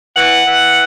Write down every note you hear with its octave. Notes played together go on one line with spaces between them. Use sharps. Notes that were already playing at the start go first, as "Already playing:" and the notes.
E3 F#5
E3